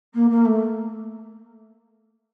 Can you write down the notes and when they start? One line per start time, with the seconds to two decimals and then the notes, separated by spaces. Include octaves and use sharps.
0.14 A#3
0.30 A#3
0.45 A3